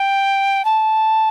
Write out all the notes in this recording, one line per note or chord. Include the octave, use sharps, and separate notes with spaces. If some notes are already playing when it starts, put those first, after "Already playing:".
Already playing: G5
A5